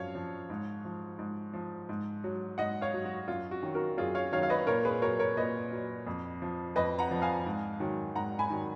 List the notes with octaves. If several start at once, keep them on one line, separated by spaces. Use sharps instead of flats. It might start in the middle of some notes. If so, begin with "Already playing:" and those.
Already playing: F#2 F3 C#5 F5
F3
G#2
F3
G#2
F3
G#2
F#3
G#2 D#5 F#5
C#5 F5
F#3
F#4
F#2 F4
F#4
D#3 F#3
F#4 A#4
F#2 F4 G#4
C#5 F5
D#3 F#3 C#5 F5
F5
B4 D#5
A#2 A#4 C#5
G#4 B4
F#3 A#4 C#5
A#4 C#5
A#2 B4 D#5
F#3
F2
F3
F2 B4 D#5
F#5 A#5
F3
F5 G#5
G#2
D#3 F#3
G#2 F#5 A#5
G#5 B5
D#3 F#3